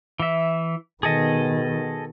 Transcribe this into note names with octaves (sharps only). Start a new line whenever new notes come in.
E3 E5
B2 D#3 G#4 A4 D#5